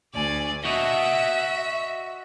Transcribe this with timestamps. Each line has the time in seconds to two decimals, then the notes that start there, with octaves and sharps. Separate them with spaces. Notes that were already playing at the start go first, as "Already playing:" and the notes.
0.13 D2 D5 G#5
0.65 F#4 D#5 E5